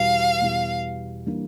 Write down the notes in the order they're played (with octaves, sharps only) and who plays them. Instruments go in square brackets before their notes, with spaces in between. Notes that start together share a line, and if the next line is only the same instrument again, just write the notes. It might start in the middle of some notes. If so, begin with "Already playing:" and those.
Already playing: [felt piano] E2 B2 G3 [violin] F5
[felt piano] E2 B2 G3
E3 G3 A#3 D4